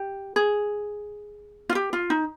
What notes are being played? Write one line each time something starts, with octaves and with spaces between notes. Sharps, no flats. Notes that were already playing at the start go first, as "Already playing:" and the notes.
Already playing: G4
G#4
F4
G4
F4
D#4